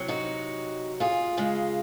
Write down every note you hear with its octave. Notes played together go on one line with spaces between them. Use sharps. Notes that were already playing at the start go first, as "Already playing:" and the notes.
Already playing: C3 F#3
D#4 F#4
F4 G#4
C#3 G#3